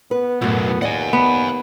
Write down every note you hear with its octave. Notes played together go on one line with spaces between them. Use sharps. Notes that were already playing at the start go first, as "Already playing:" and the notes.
B3 B4
B1 F#2 A2
D#2 D5 D#5 F#5 G#5
D#2 B3